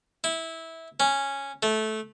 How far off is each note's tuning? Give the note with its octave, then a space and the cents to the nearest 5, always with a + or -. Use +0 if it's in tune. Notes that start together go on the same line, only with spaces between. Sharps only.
E4 -15
C#4 -5
A3 -15